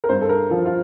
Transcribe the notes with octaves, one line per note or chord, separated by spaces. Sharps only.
A#4
G2 C5
A4
A#4
F3 F4
F4